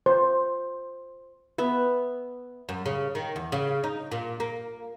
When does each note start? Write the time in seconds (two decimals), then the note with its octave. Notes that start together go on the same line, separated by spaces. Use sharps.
0.06 C5
1.58 B3 E5
2.69 F#2
2.86 C#3
3.15 D#3
3.36 E2
3.52 C#3
3.84 D#4
4.12 A#2
4.40 A#3